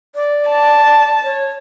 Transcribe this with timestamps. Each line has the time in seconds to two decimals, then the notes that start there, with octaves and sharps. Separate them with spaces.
0.15 D5
0.49 A5
1.24 C#5